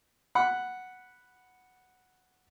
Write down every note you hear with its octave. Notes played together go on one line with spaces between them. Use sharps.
F#5 B5